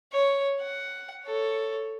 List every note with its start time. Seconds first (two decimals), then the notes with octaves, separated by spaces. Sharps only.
0.12 C#5
0.60 F#5
1.24 A4 C#5